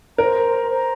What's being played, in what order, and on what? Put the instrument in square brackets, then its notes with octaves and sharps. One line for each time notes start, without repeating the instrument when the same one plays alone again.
[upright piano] A#4 [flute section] C5 A#5
[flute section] C5 A#5